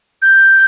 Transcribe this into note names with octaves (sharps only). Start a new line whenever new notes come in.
G6